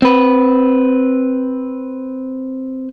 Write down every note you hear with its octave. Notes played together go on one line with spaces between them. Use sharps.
C4 B4